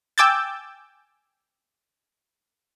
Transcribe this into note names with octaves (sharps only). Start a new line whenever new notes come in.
G5 G#5 D6 E6 G6 A6